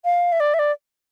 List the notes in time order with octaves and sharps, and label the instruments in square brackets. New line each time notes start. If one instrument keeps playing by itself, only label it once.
[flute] F5
E5
D5
E5
D5